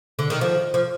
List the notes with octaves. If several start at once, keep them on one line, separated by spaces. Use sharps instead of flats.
D3
D#3
F3
F3